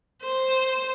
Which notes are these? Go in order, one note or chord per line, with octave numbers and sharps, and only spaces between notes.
C5